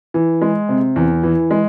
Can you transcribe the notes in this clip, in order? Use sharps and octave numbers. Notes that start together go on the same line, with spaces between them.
E3
G#3
C3
E2
E3
G#3